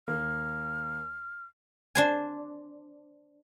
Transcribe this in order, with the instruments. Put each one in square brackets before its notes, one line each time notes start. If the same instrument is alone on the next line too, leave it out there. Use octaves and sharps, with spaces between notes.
[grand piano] D#2 A#3 [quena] F6
[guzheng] D4 C5 G#5